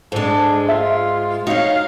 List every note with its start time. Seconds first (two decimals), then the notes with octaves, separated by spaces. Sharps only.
0.12 G#2 G#3 D4 A4
0.69 F4 E5
1.47 D#4 F#4 C#5 F5